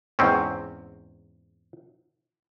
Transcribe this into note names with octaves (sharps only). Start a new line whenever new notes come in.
E2 G#2 C4 C#4